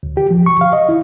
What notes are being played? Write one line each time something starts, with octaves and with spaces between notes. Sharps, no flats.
D2
G4
F3
C#6
F5
D#5
E4